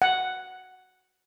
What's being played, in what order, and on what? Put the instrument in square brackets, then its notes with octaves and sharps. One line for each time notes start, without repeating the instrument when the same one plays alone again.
[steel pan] F#5